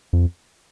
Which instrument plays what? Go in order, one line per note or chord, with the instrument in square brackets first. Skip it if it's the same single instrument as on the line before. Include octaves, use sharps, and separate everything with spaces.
[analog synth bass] F2